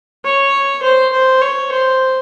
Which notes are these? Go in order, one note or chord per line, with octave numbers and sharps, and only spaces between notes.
C#5
C5
C5
C#5
C5